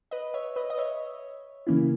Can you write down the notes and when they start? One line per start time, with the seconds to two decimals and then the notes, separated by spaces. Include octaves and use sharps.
0.11 B4 D#5
0.34 C#5 E5
0.56 B4 D#5
0.70 D#5
0.78 C#5 E5
1.67 C#3 E3 A#3 C#4 E4